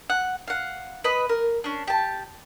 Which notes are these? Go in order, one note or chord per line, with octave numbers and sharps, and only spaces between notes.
F#5
F5 F#5
B4 D#5 B5
A#4
C#4 D4
G4 A5